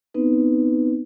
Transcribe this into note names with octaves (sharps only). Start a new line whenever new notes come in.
B3 C4 D#4 B4